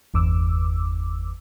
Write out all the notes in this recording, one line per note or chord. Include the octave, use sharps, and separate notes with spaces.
G1 E2 D6 E6